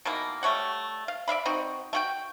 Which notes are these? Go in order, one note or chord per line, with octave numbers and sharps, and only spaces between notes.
B2 D#3 E3 A#3
G3 A3 C#5 F#5
F5
D5 E5 F5 B5
C4 D#4 F#4
A3 F#4 G5